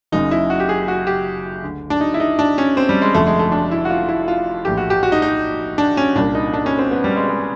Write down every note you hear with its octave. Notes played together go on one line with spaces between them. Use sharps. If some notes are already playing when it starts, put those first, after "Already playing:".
F#1 F#2 C#3 D#4
E4
F#4
G4
G#4
F#4
G4
D2 D3
D4
D#4
E4
D#4
D4
C#4
C4
G3
G#3
F1 F2 D3 A3
G#3
A3
D4
E4
F#4
F4
E4
F4
A#1 A2 E3 G4
F#4
G4
F#4
D#4
D#4
D4
C#4
C2 A#2 D4
D#4
D4
C#4
C4
B3
G3
G#3
G#3